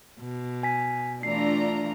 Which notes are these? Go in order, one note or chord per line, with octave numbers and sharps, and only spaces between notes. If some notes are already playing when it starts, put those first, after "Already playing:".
B2
G#5 B6
E3 A3 D4 F4 A#5 C7